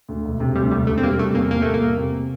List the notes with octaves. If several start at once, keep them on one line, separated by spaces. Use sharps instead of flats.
D2
E1
C3
D2 G3
E1 G3
E1 A3
C4
G3 A#3
C3 A3
E2 A#3
G3 A#3
E2 A3
A#3
C3
C3